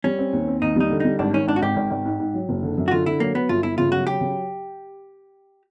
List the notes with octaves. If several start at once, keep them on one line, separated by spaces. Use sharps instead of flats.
G3 C#4
C4
D#2
C4
D#2 D#4
G3 D#4
D3
G3 D#4
G#1 D4
D#3 C#4
G#1 D4
F#4
G#1 G4
G#1
G#1
G#2
G#2
F#3
F#1
D3
F#2
F#4
D3 F4
D3 E4
F#3 A#3
F#3 B3
G1 F4
G1 E4
C#3 F4
F#3 F#4
F#3 G4
C#3